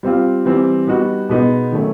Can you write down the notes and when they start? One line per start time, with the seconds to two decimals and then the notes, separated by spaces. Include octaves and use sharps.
0.03 G3 C4 F4
0.45 E3 G3 C4
0.87 G3 B3 D#4 F#4
1.29 B2 G#3 B3 D#4
1.72 D#3 F#3 A3 C#4